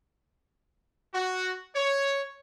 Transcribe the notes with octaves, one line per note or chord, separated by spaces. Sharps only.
F#4
C#5